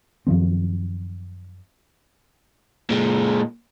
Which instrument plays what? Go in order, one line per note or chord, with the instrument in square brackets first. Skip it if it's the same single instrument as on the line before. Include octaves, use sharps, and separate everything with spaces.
[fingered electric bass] F#2 D#3 F3 C4
[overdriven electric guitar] A#2 G#3